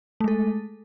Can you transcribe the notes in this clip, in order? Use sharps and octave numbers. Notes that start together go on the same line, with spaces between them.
G#3 A3 A4